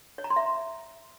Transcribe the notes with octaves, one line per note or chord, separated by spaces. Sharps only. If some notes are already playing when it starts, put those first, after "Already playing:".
C#5
A#5
C6
E5